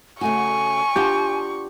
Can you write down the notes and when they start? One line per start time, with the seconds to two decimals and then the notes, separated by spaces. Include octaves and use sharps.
0.21 C#3 A3 F#4 G#5 C#6
0.96 B3 D4 F4 G4